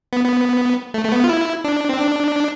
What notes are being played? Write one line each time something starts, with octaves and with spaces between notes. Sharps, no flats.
B3
B3
A3
A3
B3
F4
E4
D4
C4
D4